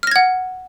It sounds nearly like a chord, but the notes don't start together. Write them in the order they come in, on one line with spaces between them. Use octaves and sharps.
F6 A#6 G#6 F#5